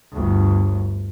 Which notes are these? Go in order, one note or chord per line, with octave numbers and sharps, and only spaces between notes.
G1 D2